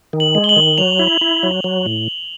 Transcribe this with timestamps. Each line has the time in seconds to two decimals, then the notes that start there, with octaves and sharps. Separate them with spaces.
0.13 D#3
0.20 F#7
0.35 G#3
0.44 G7
0.49 F#7
0.56 D#3
0.78 F#3 F7
0.99 E4
1.21 E4
1.43 F#3
1.64 F#3
1.86 A2